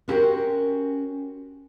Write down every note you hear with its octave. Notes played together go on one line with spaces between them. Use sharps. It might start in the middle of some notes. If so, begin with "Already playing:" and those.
B3 C#4 F#4 G4 A#4 C5